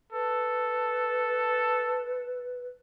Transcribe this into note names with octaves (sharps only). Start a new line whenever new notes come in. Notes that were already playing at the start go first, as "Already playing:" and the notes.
A4 B4